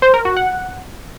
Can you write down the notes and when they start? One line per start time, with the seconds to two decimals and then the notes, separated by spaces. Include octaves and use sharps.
0.02 C5
0.14 A#4
0.25 F#4
0.37 F#5